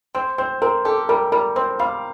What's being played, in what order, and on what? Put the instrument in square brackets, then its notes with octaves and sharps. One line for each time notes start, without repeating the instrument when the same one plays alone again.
[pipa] C4 [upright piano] C5
[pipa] C4 [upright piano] C5
[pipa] C4 [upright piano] A#4
[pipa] G4 [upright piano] A4
[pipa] G3 [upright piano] A#4
[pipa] G3 [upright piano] A#4
[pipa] C4 [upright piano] C5
[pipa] G3 [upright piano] F5